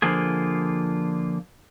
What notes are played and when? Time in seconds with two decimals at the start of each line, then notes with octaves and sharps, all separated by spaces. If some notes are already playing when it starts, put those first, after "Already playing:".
0.02 D3 F3 A#3 F4 G#4